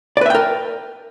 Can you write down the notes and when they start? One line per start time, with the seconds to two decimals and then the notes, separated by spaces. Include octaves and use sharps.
0.17 D5
0.21 B4
0.26 E5
0.30 G5
0.35 A#4